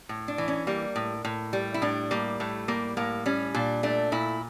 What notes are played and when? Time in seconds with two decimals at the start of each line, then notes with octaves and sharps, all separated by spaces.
0.09 A2
0.28 D4
0.38 E3
0.48 C#4
0.67 G3 A#3
0.96 A2
1.25 A2
1.53 G3
1.74 E4
1.82 A2 D4
2.11 G3 A#3
2.40 A2 A3
2.68 G3 A#3
2.97 A2 A#3
3.26 G3 C#4
3.54 A#2 D4
3.83 A3 D4
4.12 A#2 E4